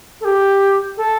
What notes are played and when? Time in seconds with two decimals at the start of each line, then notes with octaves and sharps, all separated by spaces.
0.21 A4
0.25 G4
0.97 A4